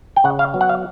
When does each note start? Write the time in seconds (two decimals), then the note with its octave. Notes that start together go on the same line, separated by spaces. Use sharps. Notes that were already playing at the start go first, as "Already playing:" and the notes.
0.16 G5
0.24 C#3 F#5
0.39 F5
0.54 F#3 B3
0.61 F#5
0.69 F5